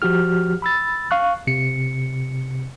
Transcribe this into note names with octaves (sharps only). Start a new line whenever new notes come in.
F3 F#4 G4 F6
B5 E6 A6
F5 C#6 F#6
C3 C#7